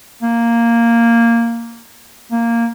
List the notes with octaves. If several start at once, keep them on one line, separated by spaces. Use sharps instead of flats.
A#3
A#3